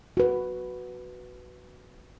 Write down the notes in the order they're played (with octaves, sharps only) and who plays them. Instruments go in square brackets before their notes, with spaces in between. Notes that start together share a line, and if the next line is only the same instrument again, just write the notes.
[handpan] F#4 B4